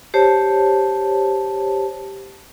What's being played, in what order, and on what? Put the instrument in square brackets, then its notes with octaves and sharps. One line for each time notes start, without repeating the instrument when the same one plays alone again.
[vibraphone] G4 C5 C#5 A5